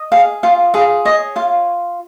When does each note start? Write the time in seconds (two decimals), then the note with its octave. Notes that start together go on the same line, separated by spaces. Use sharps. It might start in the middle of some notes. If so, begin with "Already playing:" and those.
Already playing: D#5
0.12 G#4 F5
0.43 F4 F5
0.74 G#4 F5
1.05 C#5 D#5
1.36 F4 F5